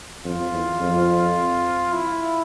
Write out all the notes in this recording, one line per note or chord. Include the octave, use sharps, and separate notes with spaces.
F2 F4
E2
F2
E4